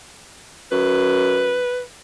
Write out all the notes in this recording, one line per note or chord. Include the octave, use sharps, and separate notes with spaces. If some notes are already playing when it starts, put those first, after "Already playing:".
F#2 B4